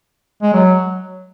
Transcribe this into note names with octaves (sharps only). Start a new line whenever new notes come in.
G#3
F#3